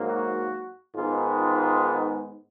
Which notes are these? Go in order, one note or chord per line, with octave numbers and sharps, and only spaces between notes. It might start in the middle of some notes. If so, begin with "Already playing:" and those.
Already playing: G#2 F#3 A#3
F#4
G#2 D#3 G#3 B3 F4
F4